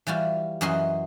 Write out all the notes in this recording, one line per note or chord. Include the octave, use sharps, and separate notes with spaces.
E3 G3 F4 F#4
F#2 E3 F#4 D#5 C6